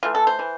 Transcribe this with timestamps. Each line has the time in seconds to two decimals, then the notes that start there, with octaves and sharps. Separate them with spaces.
0.03 E3 A3 F4
0.15 A4
0.27 C5
0.39 E3